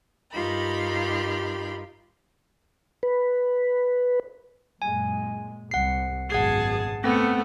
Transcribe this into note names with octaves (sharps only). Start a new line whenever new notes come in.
G2 D#4 F4 G4 A#4 B5
B4
F#2 A#2 G#3 G#5
C2 F#5 C7
G#1 F#2 B2 G#4 F#5 A5 G#6 C7
A3 B3 C4 F#5